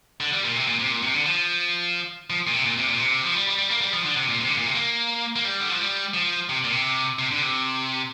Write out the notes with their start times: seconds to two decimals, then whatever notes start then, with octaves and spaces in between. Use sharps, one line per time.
0.20 D3
0.32 G3
0.45 A#2
0.56 C3
0.68 A#2
0.79 C3
0.91 A#2
1.03 C3
1.14 D3
1.26 F3
2.30 F3
2.47 A#2
2.53 C3
2.65 A#2
2.77 C3
2.88 A#2
3.00 C3
3.24 F3
3.35 G3
3.47 G3
3.59 G3
3.70 A#3
3.81 G3
3.93 F3
4.05 D3
4.17 C3
4.28 A#2
4.40 C3
4.48 D3
4.57 A#2
4.66 C3
4.75 A#3
5.36 A#3
5.45 G3
5.60 D3
5.70 F3
5.80 G3
6.14 F3
6.49 C3
6.64 A#2
6.72 C3
7.19 C3
7.31 D3
7.43 C3